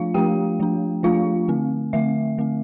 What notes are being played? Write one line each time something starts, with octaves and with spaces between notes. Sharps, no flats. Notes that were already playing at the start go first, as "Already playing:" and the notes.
Already playing: F3 A3 D4 F4 F5
F3 A3 D4 G4 G5
F3 A3 D4
F3 A3 D4 F4 F5
D3 A3 C4
D3 A3 C4 E5
D3 A3 C4